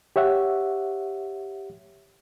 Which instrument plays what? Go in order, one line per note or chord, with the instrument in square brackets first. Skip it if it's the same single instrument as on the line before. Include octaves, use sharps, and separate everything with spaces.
[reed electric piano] G4 C#5 E5 F#5